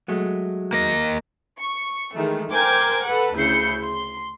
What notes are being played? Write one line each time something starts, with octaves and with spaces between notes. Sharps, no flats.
F#3 G#3 A3
A#3 D#5
C#6
D#3 E3 G#3 A3
A#4 C5 G5 G#5 D6 G#6
A4 B4 F#5
D2 C#3 E4 G6 C7 C#7
C6